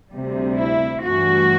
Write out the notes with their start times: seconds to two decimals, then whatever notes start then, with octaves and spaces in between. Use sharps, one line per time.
0.11 D2 C3 G3
0.56 E4
1.03 G2 E3 A3 F#4